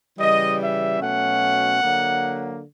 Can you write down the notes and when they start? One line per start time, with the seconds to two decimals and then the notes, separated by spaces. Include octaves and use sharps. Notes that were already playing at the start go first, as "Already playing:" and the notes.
0.18 C#3 E3 G3 D#5
0.59 E5
0.99 B2 F#3 A3 C#4 F#5
1.81 D3 F#3 A#3